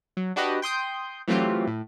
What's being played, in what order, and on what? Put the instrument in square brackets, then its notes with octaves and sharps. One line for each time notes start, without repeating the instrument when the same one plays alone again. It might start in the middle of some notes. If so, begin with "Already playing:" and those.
[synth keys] F#3
D4 F#4 G4 B4 D#5
G5 C6 D#6 G6
E3 F#3 A3 C4 F4 G4
A2